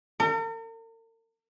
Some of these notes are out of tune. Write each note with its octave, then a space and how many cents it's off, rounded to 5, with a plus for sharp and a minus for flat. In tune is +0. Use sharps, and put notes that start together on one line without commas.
A#4 -45